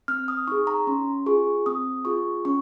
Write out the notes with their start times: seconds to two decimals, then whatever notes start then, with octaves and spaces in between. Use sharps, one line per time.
0.08 C4 F6
0.28 D#6
0.47 D#4 G#4 C#6
0.67 A#5
0.87 C#4 C6
1.26 F4 G#4 C#6
1.66 C4 D#6
2.05 F4 G#4 C#6
2.45 C#4 C#6